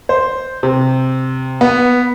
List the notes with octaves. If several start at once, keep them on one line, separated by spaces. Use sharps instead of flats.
C5
C3
B3